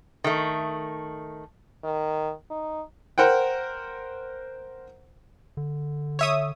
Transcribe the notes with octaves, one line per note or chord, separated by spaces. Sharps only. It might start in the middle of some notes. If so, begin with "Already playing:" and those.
D#3 A3
D#3
D#4
A#4 C5 F#5 G5
D3
C#5 E5 D#6